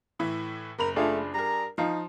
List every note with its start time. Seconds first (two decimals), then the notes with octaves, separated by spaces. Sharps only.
0.19 A2 E3 E4
0.79 F#1 A#4 B5 F7
0.96 A3 D4 F4 G#4
1.34 G3 A#4 A#5
1.78 F3 D#4 F5